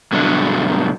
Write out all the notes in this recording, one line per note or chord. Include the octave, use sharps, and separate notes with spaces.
G2 B2 D3 F#3 D4